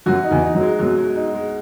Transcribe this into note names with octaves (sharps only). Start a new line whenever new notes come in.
F#2 F#3 F#4
D#4
E2 E3
D#4
F#2 F#3
G#3
F#2 B2 F#3
G#3
D#4
G#3